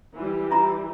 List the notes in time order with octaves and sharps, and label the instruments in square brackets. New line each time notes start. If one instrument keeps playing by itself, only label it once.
[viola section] E3 G3
[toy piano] F4 A#5 B5